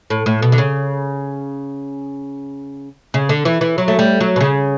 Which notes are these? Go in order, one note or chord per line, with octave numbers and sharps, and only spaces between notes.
A2
A2
B2
D3
C#3
C#3
D3
E3
E3
F#3
A3
G3
F#3
B2
C#3